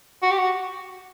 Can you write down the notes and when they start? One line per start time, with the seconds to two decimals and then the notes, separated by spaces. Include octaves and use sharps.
0.22 F#4
0.30 G4
0.37 F#4